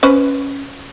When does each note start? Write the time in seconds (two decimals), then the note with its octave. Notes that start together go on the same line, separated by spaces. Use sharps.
0.03 C#4 B4 C5